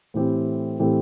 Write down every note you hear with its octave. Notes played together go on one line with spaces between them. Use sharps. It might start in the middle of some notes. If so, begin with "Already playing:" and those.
A2 E3 A3 C4 G4
A2 E3 A3 C4 G4